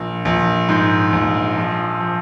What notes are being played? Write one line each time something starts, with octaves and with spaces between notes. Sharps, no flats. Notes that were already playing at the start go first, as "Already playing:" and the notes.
Already playing: A#1
A#1
G#2
A#1
F3
F3